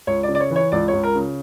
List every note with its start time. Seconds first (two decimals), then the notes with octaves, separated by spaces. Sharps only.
0.07 C#2 C#5
0.23 D5
0.29 C#3
0.35 D5
0.40 C#5
0.51 E3
0.56 C#5
0.72 C#2 D5
0.88 C#5
0.94 C#2
1.04 A#4
1.15 C#3